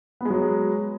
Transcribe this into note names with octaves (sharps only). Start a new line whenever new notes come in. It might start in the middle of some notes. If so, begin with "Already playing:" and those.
F#3 G#3 B3